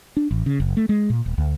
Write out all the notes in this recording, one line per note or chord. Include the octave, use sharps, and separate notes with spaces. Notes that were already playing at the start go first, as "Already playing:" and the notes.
D4
A1
C#3
F#1
A3
G#3
A#2
D#1
D2